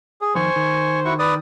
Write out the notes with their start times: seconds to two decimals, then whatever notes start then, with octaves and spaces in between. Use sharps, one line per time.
0.21 G#4
0.35 F2 D#3 C5 G#5 C#6
0.56 D#3
1.05 E4 F#4 C#6
1.19 B4 D5 D#6